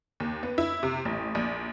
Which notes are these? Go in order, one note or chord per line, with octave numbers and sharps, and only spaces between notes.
D#2
B3
E4
C3
A1
A#1